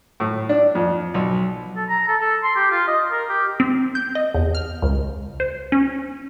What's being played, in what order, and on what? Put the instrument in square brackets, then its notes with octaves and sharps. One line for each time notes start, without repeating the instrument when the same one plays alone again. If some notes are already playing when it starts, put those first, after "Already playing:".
[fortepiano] A2
D4
F2
B1
[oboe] A4
A#5
A4
A4
C6
G4
F4
D#5
A#4
G4
[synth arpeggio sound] C4
G6
D#5
E2
F6
C#2
C5
C#4